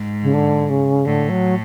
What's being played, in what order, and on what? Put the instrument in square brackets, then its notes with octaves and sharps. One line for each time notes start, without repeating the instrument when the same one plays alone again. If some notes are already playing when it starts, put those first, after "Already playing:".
Already playing: [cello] G#2
[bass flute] C#3
D3
C#3
[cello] A2 [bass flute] D3
[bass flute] F#3